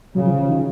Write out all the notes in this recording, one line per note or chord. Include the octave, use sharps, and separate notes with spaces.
C#3 F#3
F3
F3
D#3